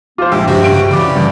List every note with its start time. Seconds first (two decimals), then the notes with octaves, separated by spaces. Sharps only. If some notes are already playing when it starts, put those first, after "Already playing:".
0.18 F3 B3 F4 C5 D6
0.32 A#1 C3 G#3 E5 G5
0.47 G2 C#3 F#4 G4
0.64 D7
0.91 C#3 E3 F#4 G4 D5 B5 D6
1.15 G2